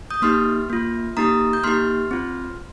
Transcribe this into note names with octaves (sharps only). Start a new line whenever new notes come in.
D#6 G6
A#3 D#4 G4 C6 F6
A#3 F4
A#3 D#4 G4 A#5 D#6
G6
A#3 D#4 G4 C6 F6
C4 F4